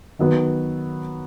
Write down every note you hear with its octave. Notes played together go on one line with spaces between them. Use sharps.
D#3 F#3 B3 F#4